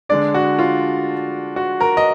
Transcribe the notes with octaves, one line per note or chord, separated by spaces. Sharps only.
D3 G#3 D4 D5
F#4
F4
F#4
A#4
D#5